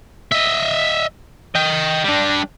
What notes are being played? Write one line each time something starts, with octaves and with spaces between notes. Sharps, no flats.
D#5 E5
D#5 G5
G3 D4